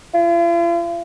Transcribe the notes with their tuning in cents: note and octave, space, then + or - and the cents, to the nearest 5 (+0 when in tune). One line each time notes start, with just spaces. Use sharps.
F4 -45